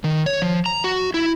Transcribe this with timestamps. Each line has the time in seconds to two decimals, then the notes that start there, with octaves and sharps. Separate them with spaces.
0.04 D#3
0.26 C#5
0.42 F3
0.66 A#5
0.84 F#4
1.14 E4